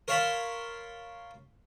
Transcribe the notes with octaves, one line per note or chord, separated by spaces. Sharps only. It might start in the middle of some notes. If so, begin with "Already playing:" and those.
A#4 C#5 F5 A5 B5 C6